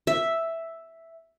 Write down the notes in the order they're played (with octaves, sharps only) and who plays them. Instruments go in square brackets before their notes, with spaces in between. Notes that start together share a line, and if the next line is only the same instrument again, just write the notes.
[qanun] E5